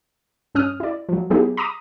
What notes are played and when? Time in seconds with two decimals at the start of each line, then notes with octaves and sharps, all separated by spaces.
0.55 G2 C#4 D#6 F6
0.80 E4 D5
1.09 F3 F#3
1.30 F#3 B3 D#4 E4 G4 G#4
1.57 A#5 B5 D6 D#6